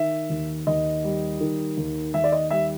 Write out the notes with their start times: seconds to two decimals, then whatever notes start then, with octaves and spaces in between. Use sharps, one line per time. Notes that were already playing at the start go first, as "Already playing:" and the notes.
Already playing: D#3 E5
0.30 D#2
0.67 D#2 D#5
1.04 G3
1.40 D#3
1.77 D#2
2.14 D#2 E5
2.24 D5
2.32 D#5
2.50 G3 E5